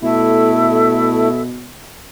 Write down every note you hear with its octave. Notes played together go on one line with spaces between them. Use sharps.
B2 A3 E4 A4 E5